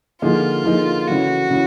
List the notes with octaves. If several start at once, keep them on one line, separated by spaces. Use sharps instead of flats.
D3 F3 A#3 D#4 F4 G#4
D3 F3 A#3 D#4 G#4
C#3 E3 A3 F#4
C#3 E3